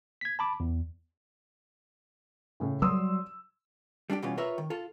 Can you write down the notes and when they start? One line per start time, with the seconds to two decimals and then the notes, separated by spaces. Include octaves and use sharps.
0.21 G#6 B6
0.39 A5 B5 D6
0.60 E2
2.60 A2 C#3
2.82 F#3 G3 C6 D#6 E6
4.10 G3 D4 F#4 G4
4.22 B2 E3 G3 C#4 F4
4.38 F4 A#4 B4 C#5 E5
4.58 D#3
4.70 F4 A4